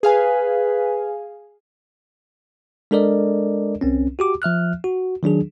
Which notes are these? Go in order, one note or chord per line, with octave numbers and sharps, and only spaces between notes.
G#4 B4 F5 G#5
G#3 D4 A4 A#4 D5 D#5
C2 C4 C#4
F#4 G4 D6
F3 E5 F6 F#6
F#4
D#3 F#3 D4 G#4